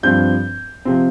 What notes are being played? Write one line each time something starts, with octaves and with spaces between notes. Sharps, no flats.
G2 F3 C4 G6
C3 F3 C4